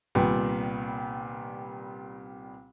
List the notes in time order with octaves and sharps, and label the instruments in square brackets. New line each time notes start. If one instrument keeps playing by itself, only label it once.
[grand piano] C2 A#2 D#3 G3 B3